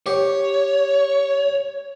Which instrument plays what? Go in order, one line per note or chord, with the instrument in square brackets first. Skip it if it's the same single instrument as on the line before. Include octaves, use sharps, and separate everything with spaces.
[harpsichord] G4 [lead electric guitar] C#5